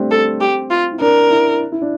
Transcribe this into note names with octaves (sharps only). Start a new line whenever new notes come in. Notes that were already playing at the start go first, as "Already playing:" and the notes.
Already playing: G3 A3 C4 D4
A4
G4
F4
E4
D4 A#4
E4
E4
D4